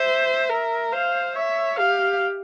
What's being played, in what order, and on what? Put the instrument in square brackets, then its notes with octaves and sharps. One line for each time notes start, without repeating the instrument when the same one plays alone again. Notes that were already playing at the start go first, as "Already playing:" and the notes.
Already playing: [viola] C5 [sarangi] E5
[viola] A#4
[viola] C5 [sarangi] F5
[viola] C#5 [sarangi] E5
[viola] G4 [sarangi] F5